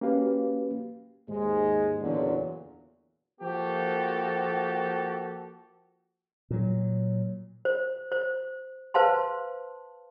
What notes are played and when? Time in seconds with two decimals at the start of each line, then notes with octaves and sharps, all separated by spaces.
0.01 A#3 C#4 F#4 G4 B4 F5
1.29 D#2 G#2 G#3
2.01 F#1 E2 A#2 D3 F#3
3.40 F3 A#3 F#4 G4 A4
6.50 A#2 F#3
7.65 C5
8.12 C5
8.94 B4 C5 F5 A5 C6